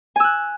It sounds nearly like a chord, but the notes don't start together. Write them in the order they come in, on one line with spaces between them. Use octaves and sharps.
G#5 E6 F#6